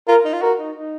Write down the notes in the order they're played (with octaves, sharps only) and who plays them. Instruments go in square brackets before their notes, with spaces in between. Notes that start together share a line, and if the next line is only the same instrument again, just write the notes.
[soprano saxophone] F4 [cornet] A#4
[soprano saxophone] D#4
F4
[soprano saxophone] F#4 [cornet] A#4
[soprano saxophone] D#4
D#4